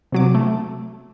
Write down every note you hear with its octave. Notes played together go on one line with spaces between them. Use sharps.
C3 F#3 D6
A3